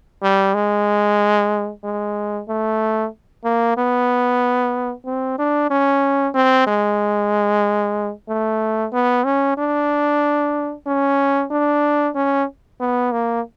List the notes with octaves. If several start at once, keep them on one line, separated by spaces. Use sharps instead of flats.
G3
G#3
G#3
A3
A#3
B3
C4
D4
C#4
C4
G#3
A3
B3
C#4
D4
C#4
D4
C#4
B3
A#3